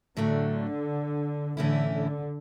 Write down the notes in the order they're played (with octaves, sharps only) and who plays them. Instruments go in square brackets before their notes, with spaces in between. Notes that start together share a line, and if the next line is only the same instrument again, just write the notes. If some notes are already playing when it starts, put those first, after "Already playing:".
[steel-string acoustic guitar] A2 F#3 A3 D4 [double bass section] D3
[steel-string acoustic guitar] A2 E3 A3 C#4 E4 [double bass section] D3
[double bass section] D3